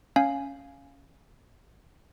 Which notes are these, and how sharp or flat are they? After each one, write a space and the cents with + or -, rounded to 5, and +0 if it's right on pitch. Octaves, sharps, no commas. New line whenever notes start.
C#4 +0 F5 +0 G#5 +0